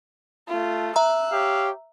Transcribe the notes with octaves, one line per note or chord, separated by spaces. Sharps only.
A3 F4
E5 A#5 E6 F#6
G4 C#5 F5